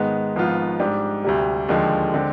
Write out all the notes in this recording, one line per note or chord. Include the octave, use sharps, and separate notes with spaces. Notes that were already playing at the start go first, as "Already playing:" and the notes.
Already playing: G#2 D#3 G#3 B3
G#1 G#2 F3 B3 F4
G#2 G3 D4 G4
D2 C3 G3
D#2 D3 F3 G#3
D3 G#3 C4